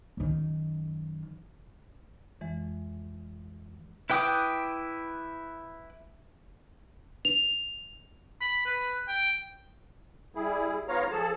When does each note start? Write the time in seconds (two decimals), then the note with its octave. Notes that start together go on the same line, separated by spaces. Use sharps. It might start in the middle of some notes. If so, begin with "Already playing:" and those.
0.17 F#2 D#3
2.41 F2 E3 G#3
4.10 E4 B4 G5 D6 D#6
7.25 F7
8.41 B5
8.66 B4
9.08 G5
10.35 G3 E4 G#4
10.88 G#2 B3 F4 C#5 F5 A#5
11.12 F3 G#4 A4 A5